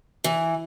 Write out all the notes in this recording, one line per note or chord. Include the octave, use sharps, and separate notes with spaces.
E3